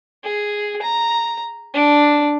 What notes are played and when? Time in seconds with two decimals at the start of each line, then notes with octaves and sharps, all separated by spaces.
0.23 G#4
0.82 A#5
1.74 D4